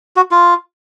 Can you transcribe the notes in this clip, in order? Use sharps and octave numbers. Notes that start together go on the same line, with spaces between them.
F#4
F4